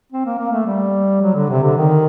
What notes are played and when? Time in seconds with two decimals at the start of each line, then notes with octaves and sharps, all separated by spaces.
0.12 C4
0.26 A#3
0.39 A#3
0.53 A3
0.66 G3
1.22 F#3
1.36 D3
1.50 C3
1.64 D3
1.78 D#3